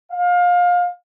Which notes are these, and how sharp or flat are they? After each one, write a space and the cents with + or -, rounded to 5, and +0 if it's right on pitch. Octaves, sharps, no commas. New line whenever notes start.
F5 +25